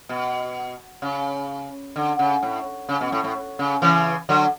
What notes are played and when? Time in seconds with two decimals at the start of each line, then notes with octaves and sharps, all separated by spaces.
0.09 B2
1.02 C#3
1.96 D3
2.19 C#3
2.43 A2
2.89 C#3
3.01 B2
3.12 A2
3.24 A2
3.59 C#3
3.82 C#3 E3
4.29 D3 F#3